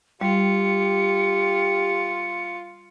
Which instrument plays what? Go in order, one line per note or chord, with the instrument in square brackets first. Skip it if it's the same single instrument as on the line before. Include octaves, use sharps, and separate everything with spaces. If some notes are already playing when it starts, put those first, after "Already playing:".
[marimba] G3 [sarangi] F4 [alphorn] G4 [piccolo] C#7